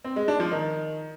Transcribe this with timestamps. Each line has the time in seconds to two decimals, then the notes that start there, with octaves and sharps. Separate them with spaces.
0.04 C4
0.16 G#3
0.28 D4
0.40 F3
0.52 D#3